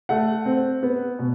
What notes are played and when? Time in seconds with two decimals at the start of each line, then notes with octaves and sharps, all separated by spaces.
0.09 A3 F#5
0.45 C4
0.83 B3
1.19 B2